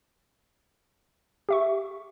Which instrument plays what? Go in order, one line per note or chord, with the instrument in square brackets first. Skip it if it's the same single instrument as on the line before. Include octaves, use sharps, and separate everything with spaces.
[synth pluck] G4 E5 C#6